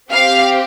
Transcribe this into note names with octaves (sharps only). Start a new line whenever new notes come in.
C4 G4 F5